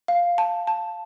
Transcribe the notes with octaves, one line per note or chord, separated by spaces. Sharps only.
F5
A5
A5